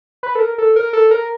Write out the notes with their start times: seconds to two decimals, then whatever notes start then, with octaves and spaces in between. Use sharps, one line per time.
0.23 B4
0.35 A4
0.40 A#4
0.58 A4
0.76 A#4
0.93 A4
1.11 A#4